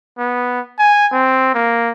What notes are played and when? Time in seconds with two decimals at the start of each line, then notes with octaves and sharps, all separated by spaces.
0.18 B3
0.79 G#5
1.12 C4
1.54 A#3